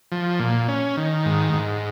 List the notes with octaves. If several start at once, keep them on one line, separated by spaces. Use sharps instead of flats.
F3
A#2
C#4
D#3
G#2
G#2